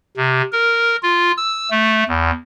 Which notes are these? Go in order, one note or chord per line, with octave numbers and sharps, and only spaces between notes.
C3
A#4
F4
E6
A3
E2